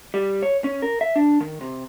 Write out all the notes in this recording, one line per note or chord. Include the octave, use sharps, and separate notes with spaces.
G3
C#5
C#4
A#4
E5
D4
D#3
C3